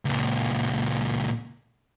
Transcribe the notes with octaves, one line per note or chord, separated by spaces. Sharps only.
C#2 A#2